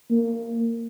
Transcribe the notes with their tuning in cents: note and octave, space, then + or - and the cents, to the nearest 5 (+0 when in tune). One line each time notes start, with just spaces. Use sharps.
A#3 -20